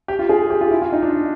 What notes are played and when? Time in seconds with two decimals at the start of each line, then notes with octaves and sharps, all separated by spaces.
0.08 G4
0.19 F4
0.29 G#4
0.50 G4
0.61 F4
0.71 E4
0.82 F4
0.93 D#4
1.03 D4